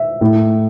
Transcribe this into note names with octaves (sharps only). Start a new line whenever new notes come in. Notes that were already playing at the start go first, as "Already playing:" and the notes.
Already playing: E5
A2 A3 E4